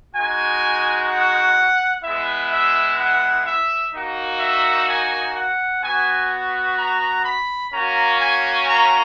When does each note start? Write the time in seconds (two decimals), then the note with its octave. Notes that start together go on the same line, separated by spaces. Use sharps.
0.15 G#3 D#4 F#4 G#5
1.10 F#5
2.03 G#3 B3 E4 E5
2.52 E5
2.99 F#5
3.46 E5
3.94 A#3 D#4 F#4
4.40 E5
4.88 G#5
5.35 F#5
5.82 B3 F#4 G#5
6.77 A#5
7.24 B5
7.72 A#3 C#4 F#4 A#5
8.20 G#5
8.67 A#5